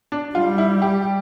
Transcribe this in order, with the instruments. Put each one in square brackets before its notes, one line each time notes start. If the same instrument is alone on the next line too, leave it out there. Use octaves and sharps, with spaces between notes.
[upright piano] D4
[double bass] G3 [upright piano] F4
[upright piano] E4
G4